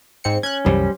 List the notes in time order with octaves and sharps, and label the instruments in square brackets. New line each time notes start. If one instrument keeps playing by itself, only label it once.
[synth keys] G#2 C4 C#7
[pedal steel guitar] C#4 [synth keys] F#6 G#6
[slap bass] C2 F#2 E3 [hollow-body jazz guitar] G3 [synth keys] C5